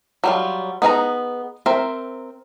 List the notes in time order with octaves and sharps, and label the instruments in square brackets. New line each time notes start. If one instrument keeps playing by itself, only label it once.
[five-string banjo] F#3 G3 F4
B3 D#4 G#4 E5 A#5
C4 A#4 E5